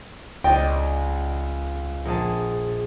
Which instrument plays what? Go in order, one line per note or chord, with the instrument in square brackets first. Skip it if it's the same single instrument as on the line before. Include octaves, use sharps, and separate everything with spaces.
[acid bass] C#2 [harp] D5 D#5 A6 [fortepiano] G5
[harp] A#1 G#4 A5